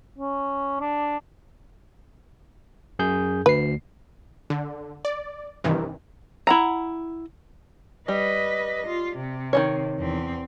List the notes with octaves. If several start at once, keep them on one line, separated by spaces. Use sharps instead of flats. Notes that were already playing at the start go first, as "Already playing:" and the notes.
C#4
D4
F#2 G#4 G6
D2 B4 C7
D3
D5
G2 C3 D#3 E3
E4 F#5 A#5
G3 B4 D#5
F4
C3
D#3 E3 C#5
E2 C4